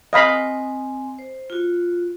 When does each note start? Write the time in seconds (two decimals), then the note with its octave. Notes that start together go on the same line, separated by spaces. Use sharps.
0.13 C4 D#5 F5 G#5 B5
1.19 C5
1.50 F4 F#4